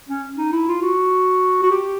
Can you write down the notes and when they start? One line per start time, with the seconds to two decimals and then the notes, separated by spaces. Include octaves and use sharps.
0.09 C#4
0.38 D#4
0.52 E4
0.68 F4
0.82 F#4
1.62 F#4
1.71 G4